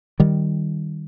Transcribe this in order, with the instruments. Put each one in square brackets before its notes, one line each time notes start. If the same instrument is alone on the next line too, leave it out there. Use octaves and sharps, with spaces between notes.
[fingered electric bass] D#3 G3